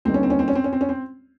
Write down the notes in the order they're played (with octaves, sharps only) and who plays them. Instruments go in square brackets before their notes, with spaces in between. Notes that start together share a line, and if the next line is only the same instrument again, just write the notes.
[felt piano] D#2 D3 G3 B3 D#4 [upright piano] C4
[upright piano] C#4
C4
C#4
C4
C#4
C4
C#4
C4
C#4
C4